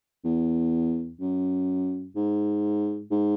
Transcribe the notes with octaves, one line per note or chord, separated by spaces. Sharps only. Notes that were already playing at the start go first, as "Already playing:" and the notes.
E2
F#2
G#2
G#2